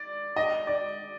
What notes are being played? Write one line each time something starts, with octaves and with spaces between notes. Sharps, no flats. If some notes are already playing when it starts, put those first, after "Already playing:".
Already playing: D5
D#5
D5